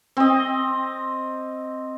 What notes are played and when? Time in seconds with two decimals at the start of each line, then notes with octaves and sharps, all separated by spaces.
0.17 C4 D#5